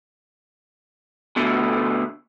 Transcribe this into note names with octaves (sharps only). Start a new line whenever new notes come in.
B2 D3 A3